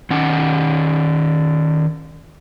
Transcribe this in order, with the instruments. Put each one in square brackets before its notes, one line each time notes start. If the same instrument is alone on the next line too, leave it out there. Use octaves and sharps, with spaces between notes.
[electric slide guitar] D#3 C#4 F#5